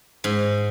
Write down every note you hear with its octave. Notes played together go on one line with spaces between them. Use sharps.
G#2